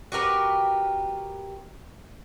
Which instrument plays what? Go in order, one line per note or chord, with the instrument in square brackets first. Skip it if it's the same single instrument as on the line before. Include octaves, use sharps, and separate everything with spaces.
[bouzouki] F#4 G4 A#4 B4